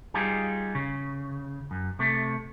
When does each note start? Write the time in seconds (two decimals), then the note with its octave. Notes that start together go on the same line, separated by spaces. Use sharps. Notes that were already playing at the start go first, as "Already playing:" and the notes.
0.14 G3 D#4 F4 G4 G#4
0.75 C#3
1.71 F#2
1.99 C3 A3